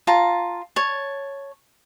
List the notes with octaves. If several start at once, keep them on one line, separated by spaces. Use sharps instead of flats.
F4 A5 A#5
C#5 A5